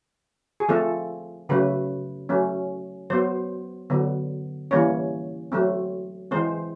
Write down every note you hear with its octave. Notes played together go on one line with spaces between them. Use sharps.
G#4
F3 A3 C4 A4
C#3 F#3 A3 B4
F#3 A3 C#4
F#3 B3 C5
D3 F#3 B3
E3 G3 A#3 C#4 C#5
F#3 A3 C4
E3 G#3 C4 C5